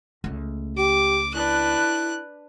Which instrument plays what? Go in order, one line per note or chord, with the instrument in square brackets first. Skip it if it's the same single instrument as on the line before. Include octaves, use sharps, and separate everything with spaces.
[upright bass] C#2 A3
[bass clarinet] G4 [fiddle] D6
[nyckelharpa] D4 B4 [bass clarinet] E4 [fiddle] F#6